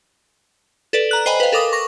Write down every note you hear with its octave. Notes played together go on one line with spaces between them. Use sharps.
A4 B4 D5
A#5 F#6 F#7
C5 D#5 G5 G#5 B5
B4 F5
A4 A#4 D6 D#6
C#6 A#6